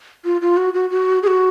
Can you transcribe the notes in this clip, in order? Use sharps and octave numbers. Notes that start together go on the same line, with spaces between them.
F4
F4
F#4
F#4
F#4
G#4
F#4